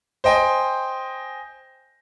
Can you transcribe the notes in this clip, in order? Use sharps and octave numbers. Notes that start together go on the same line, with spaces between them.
C5 D#5 G5 G#5